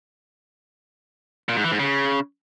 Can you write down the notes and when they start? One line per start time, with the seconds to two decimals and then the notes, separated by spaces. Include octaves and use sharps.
1.49 A#2
1.56 G#2
1.64 E3
1.72 G#2
1.79 C#3